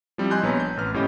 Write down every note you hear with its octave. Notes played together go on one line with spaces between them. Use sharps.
F3 G3 C4 E4
D#5 G#5 C6 F#6 G6
A#1 B3 B4 C#5 A5 A#5
G6
A1 B4 F6
G1 A2 C#4 G4 D#5 B5